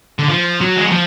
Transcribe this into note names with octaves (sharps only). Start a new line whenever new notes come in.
D3
F3
F#3
G#3
F#3
F3